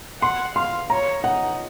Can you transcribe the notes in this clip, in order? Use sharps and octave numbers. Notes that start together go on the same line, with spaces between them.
F#5 C6
F5 C6
C#5 A#5
D#4 F#5